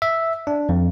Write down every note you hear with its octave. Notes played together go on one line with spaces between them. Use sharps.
E5
D4
F2